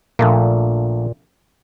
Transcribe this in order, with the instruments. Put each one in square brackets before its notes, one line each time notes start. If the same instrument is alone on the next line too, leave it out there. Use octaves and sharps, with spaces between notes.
[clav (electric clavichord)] A#1 A3 A#3 [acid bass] A#2